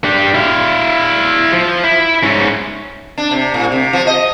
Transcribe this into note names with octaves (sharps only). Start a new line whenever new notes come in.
D4 G4
E4 F5
F3
E4
G#2 C#4
D4
C3
A2
C3
F3
D#5